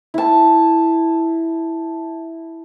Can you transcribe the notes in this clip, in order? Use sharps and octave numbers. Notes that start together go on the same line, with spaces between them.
E4 A5